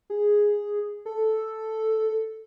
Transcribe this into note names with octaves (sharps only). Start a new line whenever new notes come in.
G#4
A4